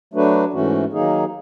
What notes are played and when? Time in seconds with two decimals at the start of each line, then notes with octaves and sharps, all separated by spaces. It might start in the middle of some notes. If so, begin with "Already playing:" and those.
0.13 F#3 A3 D4 F#4 B4
0.53 G#2 E3 A3 C#4 F#4
0.92 D#3 F#3 A#3 D#4 G#4